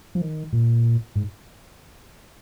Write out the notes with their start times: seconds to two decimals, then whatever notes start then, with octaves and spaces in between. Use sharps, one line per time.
0.15 F3
0.21 D#3
0.53 A#2
1.15 G#2